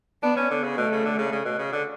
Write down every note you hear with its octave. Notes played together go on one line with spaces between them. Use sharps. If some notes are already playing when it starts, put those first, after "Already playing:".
B3 D4
C#4
D3
C#3
B2 A3
C#3
D3
C#3
C#3
B2
C#3
D3